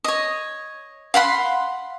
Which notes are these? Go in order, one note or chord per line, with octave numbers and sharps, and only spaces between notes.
C#5 D#5
F5 F#5 B5 C6